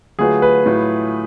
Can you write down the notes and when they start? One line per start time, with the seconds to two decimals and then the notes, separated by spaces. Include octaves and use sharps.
0.19 D3 F#3 A3 F4 G#4 B4
0.42 B4
0.66 A2 F#3 A3 F4